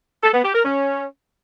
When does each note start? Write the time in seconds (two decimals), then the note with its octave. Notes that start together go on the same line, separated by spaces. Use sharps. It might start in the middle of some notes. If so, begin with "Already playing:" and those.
0.23 A4
0.34 B3
0.44 G4
0.55 A#4
0.65 C#4